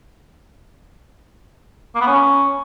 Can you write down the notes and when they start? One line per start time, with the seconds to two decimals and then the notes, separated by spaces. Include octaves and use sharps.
1.95 A#3
2.01 B3
2.07 C#4